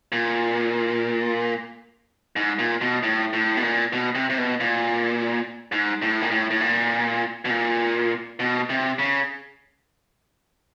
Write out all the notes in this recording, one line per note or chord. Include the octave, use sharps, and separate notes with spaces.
A#2
G#2
A#2
B2
A2
A2
B2
A#2
B2
C3
C3
B2
A#2
G#2
A2
A#2
A2
A2
A#2
B2
A#2
B2
C3
C#3